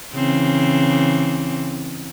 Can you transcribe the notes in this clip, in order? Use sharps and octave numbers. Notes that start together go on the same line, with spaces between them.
C#3 E3 C4